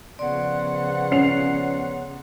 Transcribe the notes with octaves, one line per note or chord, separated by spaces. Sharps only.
C#3 F3 B3 D5 F#5 C6
C#4 C7 F7